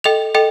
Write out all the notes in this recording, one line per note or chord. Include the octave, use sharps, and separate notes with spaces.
A4 D#5 G5 F7
A4 D#5 G5